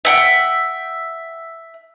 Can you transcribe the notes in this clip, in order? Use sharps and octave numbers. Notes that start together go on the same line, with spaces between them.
E5 F#5 G5